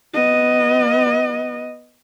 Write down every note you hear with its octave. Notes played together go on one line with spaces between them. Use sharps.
B3 D#5